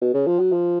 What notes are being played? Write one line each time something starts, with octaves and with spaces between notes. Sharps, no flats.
B2
C#3
F3
F#3
F3